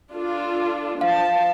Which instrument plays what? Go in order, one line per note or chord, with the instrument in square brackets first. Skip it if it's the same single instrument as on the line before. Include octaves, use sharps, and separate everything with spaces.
[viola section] D4 F4 A4
[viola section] F3 A5 [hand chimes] F5